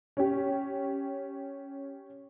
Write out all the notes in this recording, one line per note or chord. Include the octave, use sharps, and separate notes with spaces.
C#4 G4